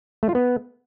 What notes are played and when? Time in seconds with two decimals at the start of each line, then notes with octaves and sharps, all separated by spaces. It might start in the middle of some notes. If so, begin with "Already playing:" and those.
0.23 A3
0.29 F4
0.35 B3